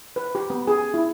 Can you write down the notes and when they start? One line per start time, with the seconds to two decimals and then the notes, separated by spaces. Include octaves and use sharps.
0.16 B4
0.35 G4
0.50 B3
0.67 G#4
0.94 E4